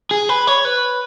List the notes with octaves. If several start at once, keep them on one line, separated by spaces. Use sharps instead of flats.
G#4
B4
C#5
B4